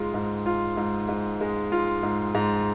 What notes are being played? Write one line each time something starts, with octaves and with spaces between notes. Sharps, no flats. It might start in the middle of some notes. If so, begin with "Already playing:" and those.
Already playing: G#2 G#3 F4
G#2
F4
G#2
G#2
G#3
F4
G#2
G#2